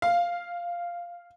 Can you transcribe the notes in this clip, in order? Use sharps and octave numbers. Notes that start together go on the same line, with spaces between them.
F5